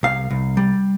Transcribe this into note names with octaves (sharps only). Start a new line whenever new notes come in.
C2 F5
C2
G3